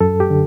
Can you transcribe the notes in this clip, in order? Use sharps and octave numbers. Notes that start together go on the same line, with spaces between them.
F#2 A4
G4
D3